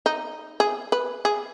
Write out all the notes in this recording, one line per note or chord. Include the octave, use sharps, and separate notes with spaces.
D#4
G#4
B4
G#4